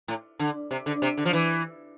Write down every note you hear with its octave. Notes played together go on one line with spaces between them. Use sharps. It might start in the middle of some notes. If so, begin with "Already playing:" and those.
A2
D3
C3
D3
C3
D3
F3
E3